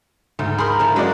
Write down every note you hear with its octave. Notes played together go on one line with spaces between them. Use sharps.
D2 G#2
G#4 A#4 B5 C6 G6
D3 F3 E4
F#3 G#3 A#3 C#4 F#4 D5